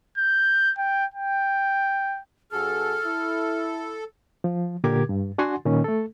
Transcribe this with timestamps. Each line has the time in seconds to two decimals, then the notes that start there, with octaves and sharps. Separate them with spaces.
0.18 G6
0.78 G5
1.14 G5
2.52 G2 F#4 G#4 A4 F6
3.05 E4
4.44 F3
4.84 A#2 D3 G4 A#4 D6 G#6
5.09 G2
5.38 D4 F#4 F#5 G#5 C6
5.65 A#2 D#3 C#4
5.84 A3 A4